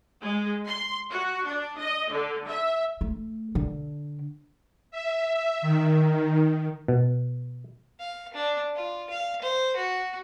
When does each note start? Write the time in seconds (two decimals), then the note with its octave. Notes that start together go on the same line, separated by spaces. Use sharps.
0.21 G#3
0.67 C6
1.10 F#4
1.46 D4
1.79 D#5
2.11 D3
2.47 E5
3.01 A3
3.55 D3
4.91 E5
5.62 D#3
6.88 B2
8.00 F5
8.34 D4
8.76 F4
9.10 F5
9.42 C5
9.77 F#4